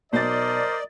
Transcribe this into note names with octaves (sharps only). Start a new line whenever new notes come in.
B1 A#4 C5 D5 D#5 A6